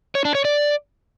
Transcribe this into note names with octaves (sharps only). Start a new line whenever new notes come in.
C#5
D4
C#5
D5